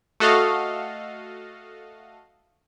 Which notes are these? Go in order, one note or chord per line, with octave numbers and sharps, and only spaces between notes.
A3 F#4 A4 D#5 F5